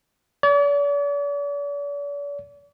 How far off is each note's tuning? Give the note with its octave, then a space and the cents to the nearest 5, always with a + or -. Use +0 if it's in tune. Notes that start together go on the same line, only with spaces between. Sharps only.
D5 -45